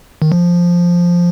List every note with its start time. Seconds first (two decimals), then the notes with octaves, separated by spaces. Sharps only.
0.22 D#3
0.32 F3